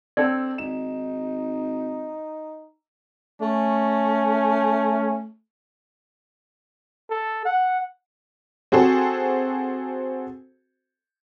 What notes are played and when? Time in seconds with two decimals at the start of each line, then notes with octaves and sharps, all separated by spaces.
0.17 C4 D4 A4 D5
0.58 G#1 D#4 E7
3.42 A3 C#4
7.10 A4
7.45 F#5
8.72 C4 F#4 G#4 A4 C5